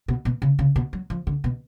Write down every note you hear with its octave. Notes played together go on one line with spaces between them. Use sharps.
B2
B2
C#3
C#3
B2
F#3
F3
D3
B2